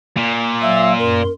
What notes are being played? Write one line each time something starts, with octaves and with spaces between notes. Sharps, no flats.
A#2
F#3 E5 F5 E6
F#2 A#4 C6